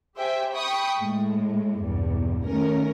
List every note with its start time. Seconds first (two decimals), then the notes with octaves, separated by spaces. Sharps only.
0.15 G4 C5 E5 G5 G#5
0.53 G5 B5 C#6 D#6
0.99 A2 G#3
1.79 B1 E2 G2
2.46 D#3 A3 C#4 A#4